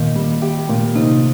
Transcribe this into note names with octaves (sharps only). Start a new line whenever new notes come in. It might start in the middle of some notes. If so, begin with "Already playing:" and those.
Already playing: A#2 D#3
G3
G4
A#2
C3 D#4